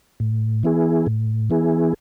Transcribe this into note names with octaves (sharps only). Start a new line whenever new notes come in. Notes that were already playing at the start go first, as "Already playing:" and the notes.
A2
E3 B3 E4 G#4
A2
E3 B3 E4 G#4